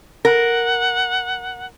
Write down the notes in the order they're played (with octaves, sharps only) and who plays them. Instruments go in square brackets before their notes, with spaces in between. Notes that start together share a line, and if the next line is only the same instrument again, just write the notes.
[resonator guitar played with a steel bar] A#4 [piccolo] F#5